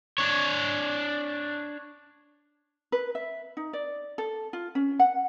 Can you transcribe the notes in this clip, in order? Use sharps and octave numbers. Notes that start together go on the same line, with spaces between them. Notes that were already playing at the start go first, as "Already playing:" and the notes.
D4 C#5
B4
E5
D#4
D5
A4
F4
C#4
F#5